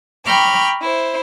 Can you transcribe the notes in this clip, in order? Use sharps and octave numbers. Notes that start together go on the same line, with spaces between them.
G5 A#5 B5 C#6 D6 F6
E4 C5